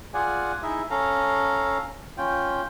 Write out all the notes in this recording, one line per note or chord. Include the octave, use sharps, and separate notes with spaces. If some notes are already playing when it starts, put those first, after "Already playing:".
F4 G#4 D5 F#5 G#5
D#4 E4 G#4 D#5 E5
C#4 A4 F5 A#5
C#4 F4 G5